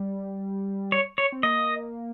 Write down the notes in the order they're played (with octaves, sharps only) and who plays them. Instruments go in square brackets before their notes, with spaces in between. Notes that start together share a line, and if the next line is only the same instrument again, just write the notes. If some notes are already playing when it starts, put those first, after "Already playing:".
Already playing: [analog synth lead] G3
[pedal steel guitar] C#5
C#5
[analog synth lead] C4
[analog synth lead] A#3 [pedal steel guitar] D#5